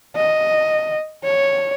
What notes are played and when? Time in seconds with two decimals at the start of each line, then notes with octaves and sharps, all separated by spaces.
0.16 D#5
1.24 C#5